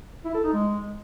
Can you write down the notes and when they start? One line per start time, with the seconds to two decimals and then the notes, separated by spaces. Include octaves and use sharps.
0.25 E4
0.34 A4
0.44 D#4
0.53 G#3